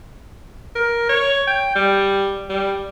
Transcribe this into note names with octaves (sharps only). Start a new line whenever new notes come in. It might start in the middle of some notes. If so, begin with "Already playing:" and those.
A#4
C#5
G5
G3
G3